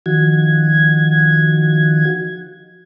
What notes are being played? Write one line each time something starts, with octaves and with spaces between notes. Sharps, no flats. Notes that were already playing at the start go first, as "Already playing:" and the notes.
D#3 F3 F#4 G#6